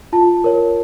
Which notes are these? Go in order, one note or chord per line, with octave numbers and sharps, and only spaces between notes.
F4 A5
A#4 C#5